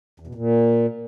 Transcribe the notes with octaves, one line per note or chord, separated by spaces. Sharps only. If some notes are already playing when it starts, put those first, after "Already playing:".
E2
B2
A#2